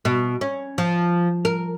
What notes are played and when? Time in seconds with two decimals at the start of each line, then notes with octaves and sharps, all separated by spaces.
0.05 B2
0.41 C#4
0.78 F3
1.45 A#4